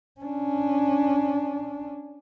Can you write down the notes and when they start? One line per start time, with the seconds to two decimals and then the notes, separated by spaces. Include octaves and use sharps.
0.21 C#4 D4